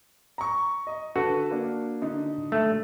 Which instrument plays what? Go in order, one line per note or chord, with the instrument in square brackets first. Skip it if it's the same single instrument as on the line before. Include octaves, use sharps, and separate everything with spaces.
[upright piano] A#5 C#6
D#5
[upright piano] D3 A4 B4 [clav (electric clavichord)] F#4
[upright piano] A#3 D4
D3 D#4
[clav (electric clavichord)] A3